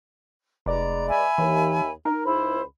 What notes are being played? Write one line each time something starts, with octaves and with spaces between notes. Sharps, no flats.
F1 G#3 B4 D5 A#5
E5 G#5 B5
D#2 E3
D#4 A#4
C#2 E4 C5 B5